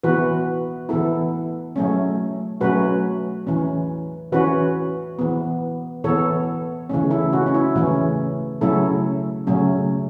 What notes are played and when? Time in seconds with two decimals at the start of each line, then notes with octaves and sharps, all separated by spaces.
0.04 E3 B3 F#4 B4
0.89 E3 B3 E4 A4
1.76 F#3 A3 C#4
2.61 F#3 A3 C#4 F#4 B4
3.47 E3 C#4
4.32 E3 C#4 F#4 B4
5.19 E3 B3
6.04 E3 B3 A4 C#5
6.90 C#3 E3 A3 C#4
7.10 E4 A4
7.33 C#4 F#4
7.46 C#4
7.54 E4
7.76 C#3 E3 A3 C#4
8.61 C#3 F#3 A3 C#4 E4 A4
9.47 C#3 F#3 A3 C#4